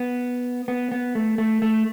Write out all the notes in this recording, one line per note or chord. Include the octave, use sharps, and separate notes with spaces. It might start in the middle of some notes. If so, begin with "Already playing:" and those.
Already playing: B3
B3
B3
A3
A3
A3